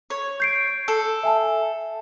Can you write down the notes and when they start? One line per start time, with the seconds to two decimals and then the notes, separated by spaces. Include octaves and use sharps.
0.10 C#5
0.40 G6 C7 D7
0.88 A4
1.23 E5 G#5 A5